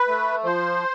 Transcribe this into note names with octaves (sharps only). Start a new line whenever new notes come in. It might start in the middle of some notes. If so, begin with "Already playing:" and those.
Already playing: B4
A3
F3 C5